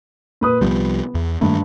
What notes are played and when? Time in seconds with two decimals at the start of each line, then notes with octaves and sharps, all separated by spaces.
0.41 A#2 B4 D#6
0.61 C2 F3 G3 B3
1.15 E2
1.41 G2 D#3 A3 A#3